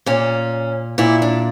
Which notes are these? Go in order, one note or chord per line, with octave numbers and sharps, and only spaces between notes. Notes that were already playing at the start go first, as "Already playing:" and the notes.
A#2 C#4
A#2 E4
D4